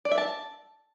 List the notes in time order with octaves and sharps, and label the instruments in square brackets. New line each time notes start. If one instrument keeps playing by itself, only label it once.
[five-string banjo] D5
E5
A5